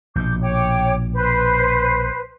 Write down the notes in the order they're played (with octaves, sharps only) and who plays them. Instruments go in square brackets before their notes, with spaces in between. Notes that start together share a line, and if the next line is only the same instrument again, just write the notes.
[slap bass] A#1 B2 [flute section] D6 G6
[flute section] C#5 G5 D6
B4 C5